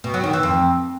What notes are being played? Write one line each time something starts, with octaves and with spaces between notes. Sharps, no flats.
B2
F#3
D#3
E3
F2